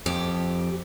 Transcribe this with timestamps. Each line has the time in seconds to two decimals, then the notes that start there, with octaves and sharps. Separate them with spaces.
0.06 F2 G4